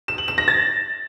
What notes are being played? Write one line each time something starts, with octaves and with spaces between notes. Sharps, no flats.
E7
F#7
E7
A#6
A6